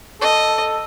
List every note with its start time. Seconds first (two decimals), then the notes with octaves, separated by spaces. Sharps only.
0.21 A4 D#5